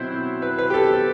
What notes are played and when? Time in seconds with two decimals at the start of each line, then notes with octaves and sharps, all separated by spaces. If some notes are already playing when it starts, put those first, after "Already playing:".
Already playing: B2 F#3 C4 E4 C5
0.42 B4
0.58 B4
0.70 G4
0.74 A4